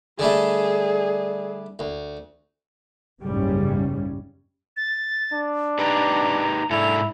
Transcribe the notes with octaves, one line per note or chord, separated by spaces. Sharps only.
D3 G3 A3 G#4
D2
F#1 B1 G#2 C#3 G3 C#4
A6
D4
D#4 G4 B4 A#5
G#2 D4 E4 A4 F7